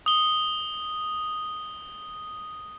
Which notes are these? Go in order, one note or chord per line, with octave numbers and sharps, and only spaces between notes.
D#6 G7